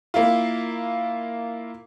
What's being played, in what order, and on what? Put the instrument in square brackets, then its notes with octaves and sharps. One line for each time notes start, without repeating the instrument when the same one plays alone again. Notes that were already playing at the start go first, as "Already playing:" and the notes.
[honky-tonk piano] A#3 E4 F4